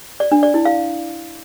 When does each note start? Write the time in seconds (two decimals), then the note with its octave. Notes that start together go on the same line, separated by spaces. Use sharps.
0.20 D5
0.31 D4
0.43 D5
0.54 E4
0.65 F5